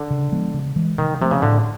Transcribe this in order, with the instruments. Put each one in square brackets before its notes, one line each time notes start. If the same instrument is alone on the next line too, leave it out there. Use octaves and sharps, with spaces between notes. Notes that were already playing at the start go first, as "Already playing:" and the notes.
Already playing: [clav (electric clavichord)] D3
[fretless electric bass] C#3
F3 G#3 B3
C#3
E3 G#3
[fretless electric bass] C3 [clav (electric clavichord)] D#3
[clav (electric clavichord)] C3 [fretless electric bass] F3 A3
[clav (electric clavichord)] C#3
[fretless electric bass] A2 [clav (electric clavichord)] D3